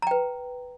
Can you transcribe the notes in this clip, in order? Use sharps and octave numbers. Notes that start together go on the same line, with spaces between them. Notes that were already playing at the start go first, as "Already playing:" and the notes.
B4 G5 A#5